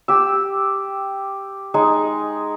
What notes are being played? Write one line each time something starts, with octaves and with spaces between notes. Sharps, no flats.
G4 E6
G#3 D#4